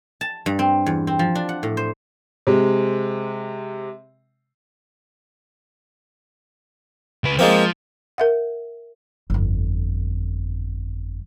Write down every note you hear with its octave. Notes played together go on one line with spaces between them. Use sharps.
A5
G2
C4
E2
C4
F3
D4
F#5
A2
C5
C3 G#3
C#2 B4
F3 G#3 A#3 C4
A#4 E5 F#5
G1 F2